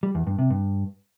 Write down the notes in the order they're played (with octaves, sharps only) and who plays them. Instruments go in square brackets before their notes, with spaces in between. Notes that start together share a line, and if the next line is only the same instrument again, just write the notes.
[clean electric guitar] G3
E2
G2
C3
G2